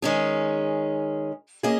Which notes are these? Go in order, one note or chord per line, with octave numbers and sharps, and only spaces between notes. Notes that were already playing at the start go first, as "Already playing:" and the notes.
D#3 G#3 C#4 G#4
A#3 C#4 G#4 D#5